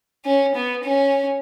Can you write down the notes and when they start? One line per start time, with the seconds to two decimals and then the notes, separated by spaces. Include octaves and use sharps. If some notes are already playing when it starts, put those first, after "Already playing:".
0.25 C#4
0.55 B3
0.84 C#4